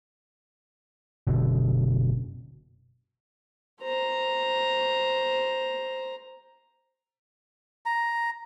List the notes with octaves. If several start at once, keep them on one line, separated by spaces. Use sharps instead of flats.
F#1 B2 D3
C5 A#5
A#5